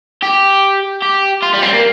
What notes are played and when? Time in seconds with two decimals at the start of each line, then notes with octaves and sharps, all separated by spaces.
0.22 G4
1.02 G4
1.42 F4
1.53 G3
1.62 C4
1.73 A#3